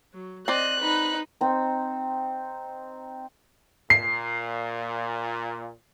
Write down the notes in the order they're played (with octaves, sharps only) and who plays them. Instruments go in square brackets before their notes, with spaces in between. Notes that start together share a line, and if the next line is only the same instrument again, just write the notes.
[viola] F#3
[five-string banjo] C4 D5 [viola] D#5 [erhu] F#6
[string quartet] D#4 [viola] B4 B5
[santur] C4 D#4
[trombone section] A#2 [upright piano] C7